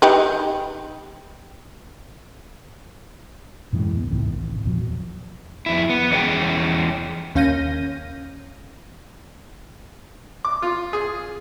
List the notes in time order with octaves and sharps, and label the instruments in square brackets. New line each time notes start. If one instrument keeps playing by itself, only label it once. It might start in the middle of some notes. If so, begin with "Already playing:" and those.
[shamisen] D#4 G4 B4
[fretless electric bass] F#2 A2 E3 G#3
D#2 B3
C2 A2 D#3 C4
A1
E2 A#2 F3 F#3
[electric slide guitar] F2 E4
B3
E2 C#4 D#4 G#4 G5
[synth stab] D#2 C#4 F5 G6 A#6 D#7
[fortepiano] D6
F4
G#4